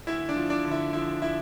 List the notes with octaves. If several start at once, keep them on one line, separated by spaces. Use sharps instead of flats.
D2 E4 E5
D4 D5
F3
D4 D5
D3
E4 E5
F3 E4 E5
E4 E5